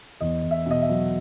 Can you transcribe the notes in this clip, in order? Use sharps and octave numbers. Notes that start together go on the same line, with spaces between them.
E2 D#5
E2
E5
B2 D#5
E5
F#3